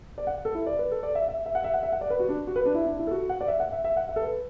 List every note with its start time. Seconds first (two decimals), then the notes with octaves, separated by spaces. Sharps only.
0.18 D5
0.27 F#5
0.45 A4
0.55 E4
0.67 D5
0.79 B4
0.91 A4
1.03 D5
1.15 E5
1.28 E5
1.46 E5
1.55 F#5
1.64 E5
1.74 F#5
1.83 E5
1.92 F#5
2.01 D5
2.10 B4
2.19 F#4
2.29 D4
2.47 F#4
2.56 B4
2.66 D4
2.75 E4
2.86 D4
2.99 E4
3.07 A4
3.11 F#4
3.29 F#5
3.41 D5
3.48 E5
3.60 F#5
3.72 E5
3.84 E5
3.97 F#5
4.09 E5
4.16 A4
4.22 B4